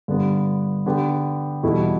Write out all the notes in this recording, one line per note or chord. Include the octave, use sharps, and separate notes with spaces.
G2 D3 G3 B3
D3 B3 G4
E2 B2 G3 E4 A4